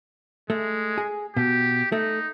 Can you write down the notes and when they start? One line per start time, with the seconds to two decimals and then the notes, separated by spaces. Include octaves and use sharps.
0.50 G#3 A3
0.98 G#4
1.37 B2 G4
1.92 A3 D#4